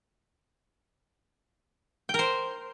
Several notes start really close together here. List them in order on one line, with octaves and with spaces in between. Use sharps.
G5 A#4 C5